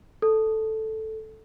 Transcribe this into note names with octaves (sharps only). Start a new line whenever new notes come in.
A4